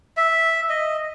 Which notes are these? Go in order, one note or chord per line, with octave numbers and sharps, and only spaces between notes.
E5
D#5